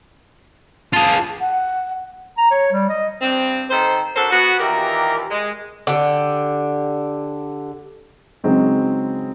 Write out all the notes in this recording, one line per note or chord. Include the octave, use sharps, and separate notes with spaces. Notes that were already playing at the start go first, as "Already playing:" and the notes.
F4 G#4 A5
F#5
A#5
C#5
G3
D#5
G2 C4
D#3 A4 C5
D4 F#4 A4 A#4 C5
B3 F#4
D#2 A#2 E3 G4 A#4
G#3
D3 G4
C#3 F#3 G#3 C4 D#4